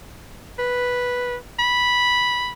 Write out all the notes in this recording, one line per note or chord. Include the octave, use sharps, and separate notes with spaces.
B4
B5